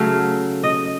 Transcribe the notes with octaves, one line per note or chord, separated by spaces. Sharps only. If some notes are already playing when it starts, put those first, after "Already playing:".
Already playing: C#3 F#3 A3 F5
D#5